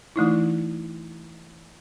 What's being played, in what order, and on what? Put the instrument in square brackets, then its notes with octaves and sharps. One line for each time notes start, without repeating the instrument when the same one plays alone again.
[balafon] E3 A3 D#4 E4